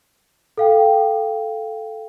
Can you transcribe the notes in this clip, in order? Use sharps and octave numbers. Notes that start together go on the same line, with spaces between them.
A4 F5 G5